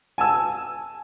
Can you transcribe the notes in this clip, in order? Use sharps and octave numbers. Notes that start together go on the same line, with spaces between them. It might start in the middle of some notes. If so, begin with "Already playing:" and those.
G#5 A5 E6